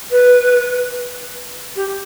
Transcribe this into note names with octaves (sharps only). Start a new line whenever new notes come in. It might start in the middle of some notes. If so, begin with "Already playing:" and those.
B4
G4